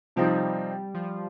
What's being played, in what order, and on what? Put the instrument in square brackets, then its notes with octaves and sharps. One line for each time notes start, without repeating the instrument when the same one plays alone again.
[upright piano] C3 F3 C4 D#4 [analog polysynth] G3
[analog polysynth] F3